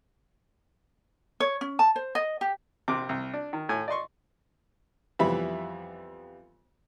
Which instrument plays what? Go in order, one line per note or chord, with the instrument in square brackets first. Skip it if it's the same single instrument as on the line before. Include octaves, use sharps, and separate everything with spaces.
[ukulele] C#5
C#4
A5
C5
D#5
G4
[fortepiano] A#1 C3 D6
C2
D4
D#3
A2 G#5
D5 D#5 C6 C#6
F2 E3 G3 B3 E5 B5